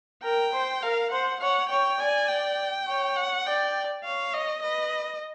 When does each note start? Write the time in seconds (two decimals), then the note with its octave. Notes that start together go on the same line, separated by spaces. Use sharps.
0.23 A#4 G5
0.53 C5
0.82 A#4 F5
1.11 C5 F#5
1.40 C#5 F#5
1.70 C#5 G5
2.00 D5 G#5
2.29 G5
2.87 C#5
3.16 F#5
3.46 D5 G5
4.04 C#5 F5
4.34 D#5
4.63 B4 D#5